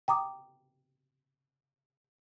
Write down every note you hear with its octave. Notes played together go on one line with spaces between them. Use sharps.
G5 A#5 D6 D#6